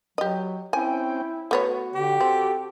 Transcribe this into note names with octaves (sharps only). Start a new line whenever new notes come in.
F#3 G4 D#5
C4 C#4 E4 G5 G#5
A3 B3 F#4 C#5
D3 G4
C4 A4